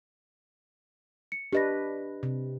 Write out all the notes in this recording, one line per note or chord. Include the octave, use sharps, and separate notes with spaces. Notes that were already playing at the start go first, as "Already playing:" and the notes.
C#7
D4 G4 B4 D#5 A#6
C3